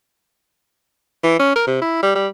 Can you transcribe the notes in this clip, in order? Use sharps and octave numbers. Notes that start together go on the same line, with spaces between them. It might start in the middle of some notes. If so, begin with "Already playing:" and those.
E3
C#4
A#4
C3
E4
G3
G3